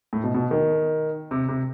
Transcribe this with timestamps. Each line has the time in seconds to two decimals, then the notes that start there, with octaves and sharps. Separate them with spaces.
0.13 A2
0.24 B2
0.34 B2
0.51 D#3
1.31 C3
1.48 C3